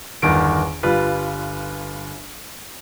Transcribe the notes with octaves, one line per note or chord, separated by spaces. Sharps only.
G1 E2 D#3 D7
G1 G3 F4 B4